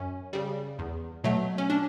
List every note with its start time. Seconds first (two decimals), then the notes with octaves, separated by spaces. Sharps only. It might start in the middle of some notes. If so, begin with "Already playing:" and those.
Already playing: F#2 C#4
0.33 C#3 G3
0.79 E2
1.24 B2 F#3 A3
1.58 C#4
1.70 D4